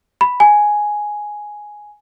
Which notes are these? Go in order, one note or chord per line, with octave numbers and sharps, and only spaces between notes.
B5
G#5